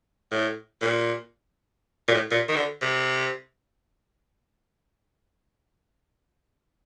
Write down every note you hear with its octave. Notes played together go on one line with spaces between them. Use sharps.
A2
A#2
A#2
A2
A#2
D#3
D3
C3